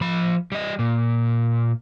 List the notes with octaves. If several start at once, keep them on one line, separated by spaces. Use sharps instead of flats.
F3 B5
G3 D#5
A#2